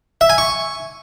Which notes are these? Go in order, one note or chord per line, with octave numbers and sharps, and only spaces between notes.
E5
G#5
C#6